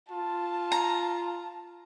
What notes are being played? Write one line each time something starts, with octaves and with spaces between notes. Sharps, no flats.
F4 A5
A#5